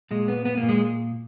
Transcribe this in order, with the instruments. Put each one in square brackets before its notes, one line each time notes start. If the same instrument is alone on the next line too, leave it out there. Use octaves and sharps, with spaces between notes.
[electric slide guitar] A#2 G#3
B3
B3
A#3
A#2
G#3